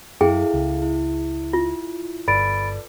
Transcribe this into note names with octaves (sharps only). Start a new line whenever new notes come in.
F#2 E4 G#4 A4 F5 G5
C#2
E4
F4
G1 A4 B4 D5 B5 A6 D7